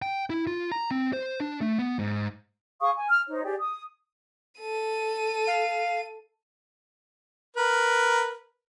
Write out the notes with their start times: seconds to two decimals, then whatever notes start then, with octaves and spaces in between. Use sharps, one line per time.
0.02 G5
0.30 E4
0.47 F4
0.72 A#5
0.91 C4
1.13 C5
1.40 D4
1.61 A3
1.78 B3
1.99 G#2
2.81 G#4 F5 C#6 D#6
2.96 G#5
3.09 F6
3.29 D#4 C5 C#5
3.44 G4 G#4 D5
3.58 D#6
4.60 A4 D#7
5.47 F5
7.57 A#4 B4